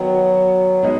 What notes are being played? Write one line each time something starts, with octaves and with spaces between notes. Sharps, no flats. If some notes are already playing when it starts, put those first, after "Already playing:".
Already playing: D#3 F#3 B3 F#4
B2 G#3 D#4